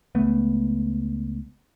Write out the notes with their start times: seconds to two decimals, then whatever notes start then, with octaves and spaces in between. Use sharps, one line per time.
0.15 C#2 A3 B3